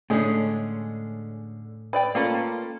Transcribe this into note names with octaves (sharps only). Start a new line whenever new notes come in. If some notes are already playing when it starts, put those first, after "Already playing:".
A2 D3 G#3 C#4 D4 G#4
B4 D5 G5
A3 A#3 C#4 F4 A4 B4